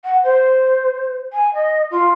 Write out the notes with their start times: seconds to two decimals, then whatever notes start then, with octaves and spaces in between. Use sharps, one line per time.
0.04 F#5
0.23 C5
1.33 G#5
1.54 D#5
1.90 F4